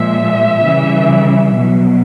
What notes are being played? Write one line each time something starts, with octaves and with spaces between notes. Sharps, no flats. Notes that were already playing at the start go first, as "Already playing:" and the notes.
Already playing: A#2 F3 G#3 E5
C#3 E3 G3
B2 F#3